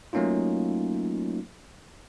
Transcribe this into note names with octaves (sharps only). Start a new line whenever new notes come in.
F#3 A3 A#3 C#4 D#4 F4